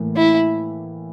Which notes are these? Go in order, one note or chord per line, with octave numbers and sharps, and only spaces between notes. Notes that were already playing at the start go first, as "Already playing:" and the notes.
Already playing: A2 E3 A#3
E4